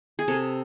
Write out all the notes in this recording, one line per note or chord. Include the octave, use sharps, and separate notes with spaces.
G#4
C3 A4